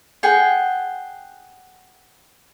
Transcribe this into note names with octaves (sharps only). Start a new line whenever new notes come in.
G#4 F#5 G5